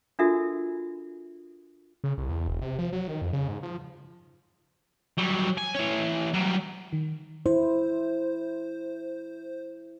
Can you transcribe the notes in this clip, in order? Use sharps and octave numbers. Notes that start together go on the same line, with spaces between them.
D4 F4 F#4 A4 A#4 E5
C#3
C2
E2
E1
C3
F3
F#3
D#3
F2
C#3
G#2
F3
F#3 G3
G#5
E3 C#5
F#3 G3
D#3
E4 C5